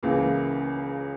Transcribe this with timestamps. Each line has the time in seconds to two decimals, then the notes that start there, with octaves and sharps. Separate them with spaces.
0.03 C#2 C#3 E3 A#3